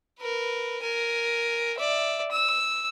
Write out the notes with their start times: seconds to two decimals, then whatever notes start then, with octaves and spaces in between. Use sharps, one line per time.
0.20 A#4 B4
0.83 A#4 G#5
1.77 D5 E5
2.31 E6